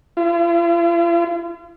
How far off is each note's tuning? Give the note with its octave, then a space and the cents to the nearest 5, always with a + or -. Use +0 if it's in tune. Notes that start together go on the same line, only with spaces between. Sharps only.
F4 -45